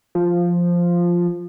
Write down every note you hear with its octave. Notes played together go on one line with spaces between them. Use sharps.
F3